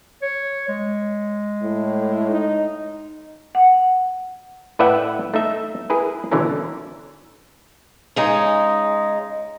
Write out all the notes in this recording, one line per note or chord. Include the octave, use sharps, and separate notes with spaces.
C#5
G#3
A2
D#4
F#5
A2 B4 D5 E5 F#5 G5
A3 D#4 E5
E4 G#4 A#4 B4
B2 D3 E3 C#4 A#4
C#3 G#3 D#4